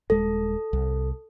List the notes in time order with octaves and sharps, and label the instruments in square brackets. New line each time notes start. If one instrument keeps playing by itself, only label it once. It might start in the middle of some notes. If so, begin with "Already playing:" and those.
[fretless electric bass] D#1 G#3 [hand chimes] A4
[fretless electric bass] C2